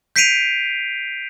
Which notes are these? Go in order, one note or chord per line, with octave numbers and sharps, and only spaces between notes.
G6 B6 C7 D7 D#7 F7